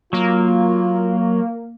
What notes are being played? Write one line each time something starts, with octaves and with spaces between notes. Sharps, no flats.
F#3 A#3 F4